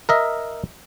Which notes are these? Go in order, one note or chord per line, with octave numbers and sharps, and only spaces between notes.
A#4 D#5 E5